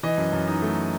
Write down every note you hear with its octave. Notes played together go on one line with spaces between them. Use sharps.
E3 D#5
F#2
F#2
D#4
A3